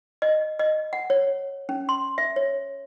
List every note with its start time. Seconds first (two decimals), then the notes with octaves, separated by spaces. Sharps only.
0.22 D#5
0.59 D#5
0.93 F#5
1.10 C#5
1.69 C#4
1.89 C6
2.18 E5
2.36 C#5